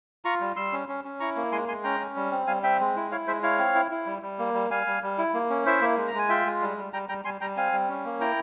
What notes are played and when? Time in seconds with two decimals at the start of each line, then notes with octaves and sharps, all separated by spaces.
0.25 F4 A#5 C#6
0.41 G3
0.56 G3 C6 E6
0.72 C#4
0.89 C#4
1.04 C#4
1.20 E4 A#5 C#6
1.36 A#3
1.52 G#3 G#5 C6
1.68 G#3 G#5 C6
1.84 C#4 G5 A#5
2.00 C#4
2.16 G3
2.31 C4
2.47 G3 F5 G#5
2.63 C4 E5 G5
2.80 G#3
2.96 E4
3.11 E4 C#5 F5
3.27 G#3 C5 E5
3.43 E4 C#5 F5
3.58 C4
3.75 E4
3.91 E4
4.06 G3
4.22 G3
4.39 A#3
4.54 G3
4.70 G3 F5 G#5
4.87 G3
5.02 G3
5.18 E4
5.34 A#3
5.50 C#4
5.66 E4 C5 E5
5.82 A#3
5.97 G#3
6.07 A#5
6.14 G#3 G#5
6.29 F4 E5 G5
6.46 G#3
6.61 G3
6.77 G3
6.93 G3 G5 A#5
7.09 G3 G5 A#5
7.24 G3 G#5 C6
7.41 G3 G5 A#5
7.57 C4 F5 G#5
7.73 G3
7.89 C#4
8.05 A#3
8.20 E4 G5 A#5